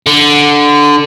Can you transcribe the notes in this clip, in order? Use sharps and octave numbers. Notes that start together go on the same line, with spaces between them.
D3